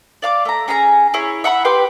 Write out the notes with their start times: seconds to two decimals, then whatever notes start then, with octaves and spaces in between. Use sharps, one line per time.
0.22 D5 F5 D6
0.45 A3 A#5
0.68 C#4 G#4 G#5 A#5
1.14 E4 G#4 C#5
1.44 E5 F#5 A#5 B5
1.65 G4 B4 G5 C6